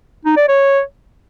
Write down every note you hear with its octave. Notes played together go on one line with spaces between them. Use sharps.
D#4
D5
C#5